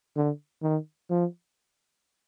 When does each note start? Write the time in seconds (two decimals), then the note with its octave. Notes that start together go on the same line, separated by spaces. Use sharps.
0.16 D3
0.62 D#3
1.10 F3